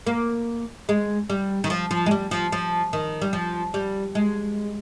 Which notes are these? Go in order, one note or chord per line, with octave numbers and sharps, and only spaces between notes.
A#3
G#3
G3
D#3
F3
F3
G#3
G3
F3
F3
D#3
G3
F3
G3
G#3